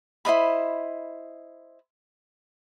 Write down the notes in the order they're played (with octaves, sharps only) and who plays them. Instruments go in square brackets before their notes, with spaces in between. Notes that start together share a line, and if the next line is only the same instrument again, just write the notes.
[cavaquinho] E4 C5 D#5 B5